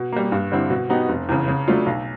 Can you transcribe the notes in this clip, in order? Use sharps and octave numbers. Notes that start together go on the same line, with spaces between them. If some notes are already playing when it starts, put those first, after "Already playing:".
Already playing: B2
G3 A#3
G2
D3 G3 C4 E4
B2
F#3 B3 D#4 G4
F1
E2 C#3
C#3
F#3 A3 D4 F4
B1